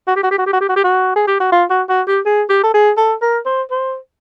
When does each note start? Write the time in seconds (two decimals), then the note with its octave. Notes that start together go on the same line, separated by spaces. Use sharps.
0.07 F#4
0.16 G4
0.23 F#4
0.31 G4
0.38 F#4
0.46 G4
0.53 F#4
0.61 G4
0.69 F#4
0.76 G4
0.84 F#4
1.16 G#4
1.27 G4
1.40 F#4
1.52 F4
1.70 F#4
1.89 F#4
2.07 G4
2.25 G#4
2.49 G4
2.63 A4
2.74 G#4
2.97 A4
3.22 A#4
3.45 C5
3.71 C5